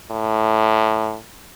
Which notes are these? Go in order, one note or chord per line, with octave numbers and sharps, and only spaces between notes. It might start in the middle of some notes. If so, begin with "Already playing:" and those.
A2